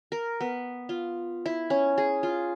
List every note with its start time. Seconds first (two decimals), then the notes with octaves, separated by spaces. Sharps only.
0.12 A#4
0.40 B3
0.89 F4
1.46 E4
1.70 C#4
1.98 G#4
2.23 F4